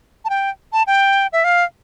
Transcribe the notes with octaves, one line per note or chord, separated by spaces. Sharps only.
A5
G5
A5
G5
E5
F5